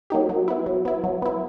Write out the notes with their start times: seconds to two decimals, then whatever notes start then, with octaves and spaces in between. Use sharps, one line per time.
0.10 F#3 A#3 D#4 G4
0.29 F#3
0.48 B3 E4
0.66 F#3
0.85 B3 E4
1.04 F#3
1.22 B3 E4